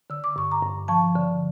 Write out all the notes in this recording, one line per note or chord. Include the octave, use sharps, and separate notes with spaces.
D3 E6
D6
G2 C#6
A#5 D6
G2
F3 A5 C#6
D3